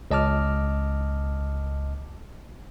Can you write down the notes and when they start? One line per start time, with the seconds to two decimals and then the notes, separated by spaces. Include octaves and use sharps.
0.11 C#2 D#5 A5 D6 F6